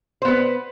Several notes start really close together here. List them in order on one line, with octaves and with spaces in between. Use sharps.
C5 B3 B4